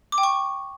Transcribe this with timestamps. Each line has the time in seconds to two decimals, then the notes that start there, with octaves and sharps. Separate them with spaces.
0.12 D6
0.18 G5
0.23 C#6